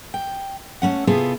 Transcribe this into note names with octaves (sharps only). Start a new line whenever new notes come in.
G5
A3 A#3 C#4 F#5
C3 B3 E4 F4 G#4 A4